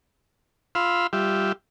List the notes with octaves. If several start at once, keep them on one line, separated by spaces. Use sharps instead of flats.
F4 F5 B5 C6 E6
G3 F4 G4 E5